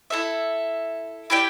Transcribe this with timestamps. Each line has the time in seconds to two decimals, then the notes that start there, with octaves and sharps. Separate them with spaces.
0.10 E4 A4 E5
1.30 E4 G4 D5 G5